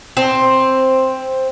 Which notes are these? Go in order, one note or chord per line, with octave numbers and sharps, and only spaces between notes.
C4